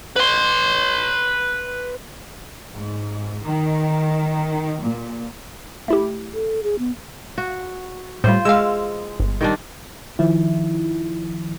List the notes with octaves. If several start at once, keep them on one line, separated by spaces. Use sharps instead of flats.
B4 C6
G#2
D#3
A#2
A3 E4 G4
A4
G#4
B3
F#4
A2 G3 F4 C5
G#3 F5 E6
G1
D#3 G3 D4
D#3 F3 E4